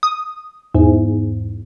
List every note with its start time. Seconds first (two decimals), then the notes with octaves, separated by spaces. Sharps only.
0.03 D#6
0.74 E2 G#2